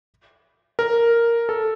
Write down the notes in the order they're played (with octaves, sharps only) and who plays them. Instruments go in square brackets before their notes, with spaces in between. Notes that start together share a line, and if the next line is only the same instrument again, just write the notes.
[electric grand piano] A#4
A4